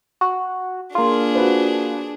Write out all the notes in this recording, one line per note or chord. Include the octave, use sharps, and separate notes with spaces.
F#4
A#3 D4 F4 G#4
F#4 B4 C5